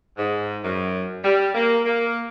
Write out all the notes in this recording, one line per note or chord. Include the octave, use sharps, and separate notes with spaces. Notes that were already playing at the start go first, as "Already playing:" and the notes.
G#2
F#2
G3
A#3
A#3